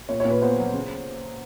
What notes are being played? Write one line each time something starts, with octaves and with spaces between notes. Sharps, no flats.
A#2 C#5
C#5
A#2
B4
B3 C5
F#3
C#3